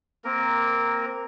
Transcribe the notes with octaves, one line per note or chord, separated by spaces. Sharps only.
A#3 C4 A#4